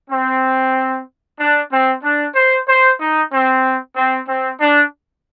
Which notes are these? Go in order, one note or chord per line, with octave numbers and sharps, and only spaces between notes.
C4
D4
C4
D4
C5
C5
D#4
C4
C4
C4
D4